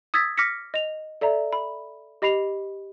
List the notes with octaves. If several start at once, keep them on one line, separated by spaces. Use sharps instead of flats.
D#6 E6 G#6 A6 B6
D6 F6 A#6 B6 C#7
D#5 F7
A4 D5 E5 A#5
B5
G4 D#5 B5 C7 F7